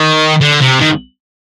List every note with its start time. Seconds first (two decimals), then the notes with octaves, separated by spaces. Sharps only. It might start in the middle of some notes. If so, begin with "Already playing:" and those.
Already playing: D#3
0.41 D3
0.61 C3
0.80 D#3